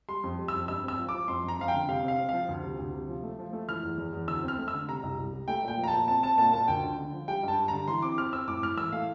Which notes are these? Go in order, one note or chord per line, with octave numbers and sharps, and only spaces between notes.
G3 C6
F2
G3
E6
F2
G2 E6
C4 E6
F3
D6
F3
F2 C6
F2 A#5
F2 F5
G5
D3
C3 F5
C4 F5
C4
F3 F5
D2
C3
D2
C3
F3
A3
F3
A3
E3 F6
E2
E2
E2
D2 E6
C4
F6
A3
E6
D3
C3 A#5
C2
C2
G3
A3 G5
A#2 G5
F3
A#5
A#2 A5
C4 A5
C4 A5
A#2 A5
A#2 A5
D2 G5
D3
D3
F3
G3 G5
G2 A5
G3
D3 A#5
E3 C6
C4 D6
C4 F6
C4 E6
A2 D6
A2 F6
E3 E6
A3 F5